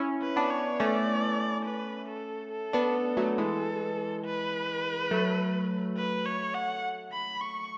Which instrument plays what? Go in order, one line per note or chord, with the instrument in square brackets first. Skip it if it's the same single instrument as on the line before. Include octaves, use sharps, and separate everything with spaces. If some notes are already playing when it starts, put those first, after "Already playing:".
Already playing: [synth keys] C#4 E4
[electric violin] B4
[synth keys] B3 D4
[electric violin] C#5
[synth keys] A3 C#4 [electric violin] D5
[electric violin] B4
A4
A4
[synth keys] B3 D4
F#3 A3
[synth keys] E3 G#3 [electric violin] A4
[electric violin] B4
[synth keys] F#3 A3
[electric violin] B4
C#5
F#5
B5
C#6